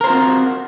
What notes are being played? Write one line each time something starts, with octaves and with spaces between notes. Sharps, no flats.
C4 F4 F#4 A#4 C5